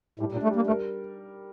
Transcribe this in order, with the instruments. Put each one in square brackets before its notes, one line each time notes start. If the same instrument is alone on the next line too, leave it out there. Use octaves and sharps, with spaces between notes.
[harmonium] A2 [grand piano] G3
[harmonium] A#2
[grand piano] D4
[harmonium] A3
[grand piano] G3 [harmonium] A#3
[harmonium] A3 [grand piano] A#4